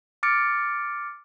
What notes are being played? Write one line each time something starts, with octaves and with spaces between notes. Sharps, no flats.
D6 F6 A6 C#7 D7